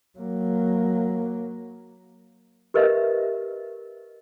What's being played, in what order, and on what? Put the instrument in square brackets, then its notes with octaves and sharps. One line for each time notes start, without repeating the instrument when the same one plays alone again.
[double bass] F#3 A#3
[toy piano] G4 A#4 B4 D#5 E5